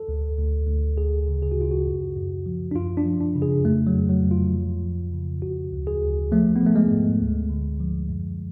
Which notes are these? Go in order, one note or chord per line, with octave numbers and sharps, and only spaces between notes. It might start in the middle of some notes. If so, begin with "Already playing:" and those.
Already playing: A4
D2
D2
D2
D2 G#4
C#3
G#4
F#4
C#3 F4
F#4
F#2
F#2
F3
D4
F#2 F4
D4
F3
D4
C#3
G#4
F2 A3
F#3
F2
F#3
F2
F4
F3
F3
C#3
C#3 F#4
D2
G#4
D2
F3 A3
B3
F3
A3
G#3
G#2
D2
D3
F3
F#2